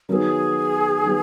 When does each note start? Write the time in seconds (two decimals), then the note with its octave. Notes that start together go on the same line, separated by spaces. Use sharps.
0.09 D#3 F#3 B3 D#4 G#4 A#4
1.03 D#3 F#3 B3 D#4